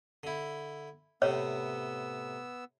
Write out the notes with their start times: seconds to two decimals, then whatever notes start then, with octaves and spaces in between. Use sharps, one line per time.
0.23 D3 E4
1.22 A2 C3 B3 C#5 E6